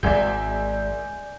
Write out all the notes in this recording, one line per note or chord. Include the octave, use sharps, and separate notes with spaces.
D#1 G#1 G#3 D5 E5 G#5 G6